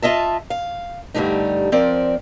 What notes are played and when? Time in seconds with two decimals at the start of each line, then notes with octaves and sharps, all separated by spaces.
0.02 F4 D#5 E5 A5
0.50 F5
1.14 G2 D3 G3 A3 D#4
1.72 F3 C4 A#4 D5